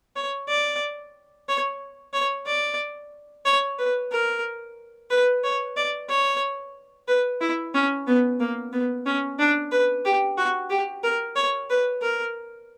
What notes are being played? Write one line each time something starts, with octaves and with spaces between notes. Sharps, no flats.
C#5
D5
C#5
C#5
D5
C#5
B4
A#4
B4
C#5
D5
C#5
B4
E4
C#4
B3
A#3
B3
C#4
D4
B4
G4
F#4
G4
A#4
C#5
B4
A#4